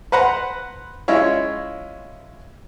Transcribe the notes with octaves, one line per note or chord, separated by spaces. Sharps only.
B4 C5 F#5 A#5 B5
G#3 C#4 E4 F4 C#5